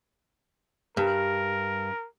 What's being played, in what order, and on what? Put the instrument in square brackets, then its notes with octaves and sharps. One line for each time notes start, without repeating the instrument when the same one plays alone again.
[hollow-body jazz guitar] G2 [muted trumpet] A#4